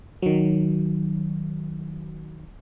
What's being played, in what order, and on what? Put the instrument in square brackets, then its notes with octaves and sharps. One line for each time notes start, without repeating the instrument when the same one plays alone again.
[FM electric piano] D#3 F#3